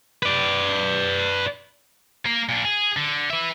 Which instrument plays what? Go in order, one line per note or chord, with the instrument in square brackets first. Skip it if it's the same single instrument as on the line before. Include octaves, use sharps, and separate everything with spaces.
[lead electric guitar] B4 D5
[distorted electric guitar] A#3
A#2 D4
G#4
D3
B4 E5